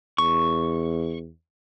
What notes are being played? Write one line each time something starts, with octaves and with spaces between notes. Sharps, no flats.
E2 C#6